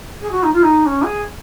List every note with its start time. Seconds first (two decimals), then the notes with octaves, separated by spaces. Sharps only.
0.21 G#4
0.31 F#4
0.43 D#4
0.53 F4
0.62 D#4
0.85 C#4
1.03 G#4